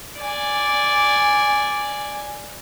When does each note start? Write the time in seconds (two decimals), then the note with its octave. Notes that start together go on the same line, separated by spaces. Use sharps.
0.20 D5 G#5